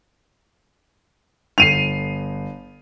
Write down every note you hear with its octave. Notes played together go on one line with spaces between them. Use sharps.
G1 C7 D#7 F7